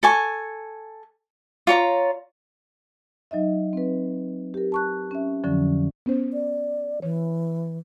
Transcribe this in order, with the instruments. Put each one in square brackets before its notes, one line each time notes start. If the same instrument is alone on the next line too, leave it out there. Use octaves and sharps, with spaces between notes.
[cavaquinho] A4 G#5 C#6
F4 C#5 A#5
[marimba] F#3 D#4 D#5 E5
C4 B4
G4 A#4
A5 C#6 F#6
C#4 E5
F2 D3 F3 F#3 C#4
B3 C#4 C5
[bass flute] D5
[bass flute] E3 [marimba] C#5